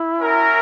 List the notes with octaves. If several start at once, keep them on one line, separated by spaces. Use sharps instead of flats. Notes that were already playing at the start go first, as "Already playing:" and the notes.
Already playing: E4
C#4 F#4 A#4 E5